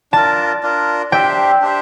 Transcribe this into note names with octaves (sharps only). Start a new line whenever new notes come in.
D4 F4 A#4 A5
D4 F4 A#4
D4 G4 C5 E5 G5
D4 G4 C5 E5